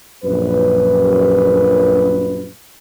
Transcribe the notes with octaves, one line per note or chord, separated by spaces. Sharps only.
A#1 F#2 B4